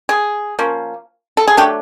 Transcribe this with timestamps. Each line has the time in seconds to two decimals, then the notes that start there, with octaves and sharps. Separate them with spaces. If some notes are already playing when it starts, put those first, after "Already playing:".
0.09 G#4
0.59 F3 A#3 C#4
1.37 A4
1.48 G#4
1.57 F#3 A3 D4 G4